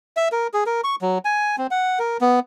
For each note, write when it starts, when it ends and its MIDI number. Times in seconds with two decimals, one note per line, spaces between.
0.17 0.29 76
0.32 0.47 70
0.54 0.64 68
0.66 0.81 70
0.84 0.96 85
1.01 1.18 54
1.25 1.56 80
1.58 1.67 60
1.71 1.99 78
1.99 2.17 70
2.21 2.40 59